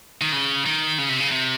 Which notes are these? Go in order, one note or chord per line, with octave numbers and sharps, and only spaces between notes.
D#3
C#3
D#3
C#3
C3
C#3
C3